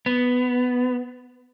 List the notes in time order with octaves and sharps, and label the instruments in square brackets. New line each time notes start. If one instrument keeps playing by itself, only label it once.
[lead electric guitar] B3